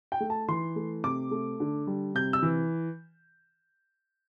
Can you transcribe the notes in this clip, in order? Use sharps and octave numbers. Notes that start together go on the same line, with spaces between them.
G5
A3
A5
E3 C6
A3
C3 D6
A3
D3
G3
C3 G6
E6
E3